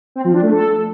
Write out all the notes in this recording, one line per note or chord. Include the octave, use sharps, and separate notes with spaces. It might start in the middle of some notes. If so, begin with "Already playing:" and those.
C4
F3
D4
A3
A4